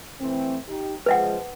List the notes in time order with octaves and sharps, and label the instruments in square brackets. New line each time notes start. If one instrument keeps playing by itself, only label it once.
[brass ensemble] E3 A3 C4
D#4 G4
[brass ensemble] C#3 F3 G#3 [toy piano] B4 E5 F#5